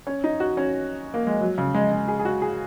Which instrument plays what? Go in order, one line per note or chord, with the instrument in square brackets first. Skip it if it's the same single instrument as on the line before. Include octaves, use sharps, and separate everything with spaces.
[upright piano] C#4
D#4
F#4
C#4
A#3
G#3
F#3
C#3
G#3
G#3
G#4
G#4
F#4
G#4